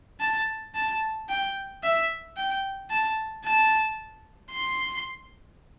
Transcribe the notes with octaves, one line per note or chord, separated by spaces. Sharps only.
A5
A5
G5
E5
G5
A5
A5
C6